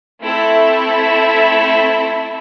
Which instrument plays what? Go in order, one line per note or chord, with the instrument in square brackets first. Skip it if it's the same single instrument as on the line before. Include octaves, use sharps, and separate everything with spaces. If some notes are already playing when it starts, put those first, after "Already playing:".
[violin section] A3 C4 E4 A4 E5